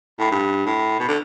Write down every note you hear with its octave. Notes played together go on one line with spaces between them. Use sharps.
A2
G2
A2
B2
D3